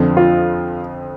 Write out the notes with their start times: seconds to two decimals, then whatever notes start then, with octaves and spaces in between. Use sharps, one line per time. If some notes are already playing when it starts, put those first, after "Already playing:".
Already playing: F2 D3 F3 C4
0.17 F4